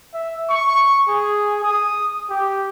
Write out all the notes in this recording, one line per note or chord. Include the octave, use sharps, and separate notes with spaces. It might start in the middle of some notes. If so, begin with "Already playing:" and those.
E5
C#6
G#4
D#6
G4